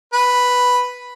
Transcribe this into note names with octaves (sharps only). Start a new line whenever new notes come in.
B4